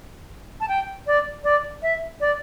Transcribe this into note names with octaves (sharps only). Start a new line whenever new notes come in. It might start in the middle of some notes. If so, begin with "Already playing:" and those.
A5
G5
D5
D5
E5
D5